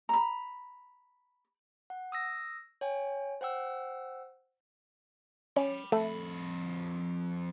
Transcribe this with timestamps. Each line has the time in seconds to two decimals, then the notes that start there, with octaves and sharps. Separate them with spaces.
0.09 A#5 B5
1.90 F#5
2.12 D#6 E6 A#6
2.81 C#5 G5 G#5
3.41 C5 F#5 G5 E6
5.56 C#4 G5 B5
5.92 F2 A3 B5